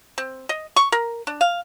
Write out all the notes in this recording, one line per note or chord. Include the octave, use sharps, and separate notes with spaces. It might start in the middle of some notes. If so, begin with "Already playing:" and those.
C4
D#5
C#6
A#4
D4
F5